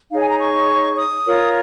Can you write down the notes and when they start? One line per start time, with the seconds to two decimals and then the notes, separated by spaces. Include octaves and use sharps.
0.11 D#4 G#4 C#5 F5
0.20 G#5
0.29 A#5
0.39 C#6
0.97 D#6
1.25 F4 A#4 C#5